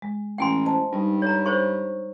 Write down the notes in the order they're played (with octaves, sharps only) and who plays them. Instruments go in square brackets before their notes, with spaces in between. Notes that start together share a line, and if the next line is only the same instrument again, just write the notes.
[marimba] G#3
[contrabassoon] A1 [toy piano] G5 G#5 C6
[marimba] C5 D#5 A5
[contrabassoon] G2 [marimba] G3 D#4
[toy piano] C#5 A#5
C5 C#5 C#6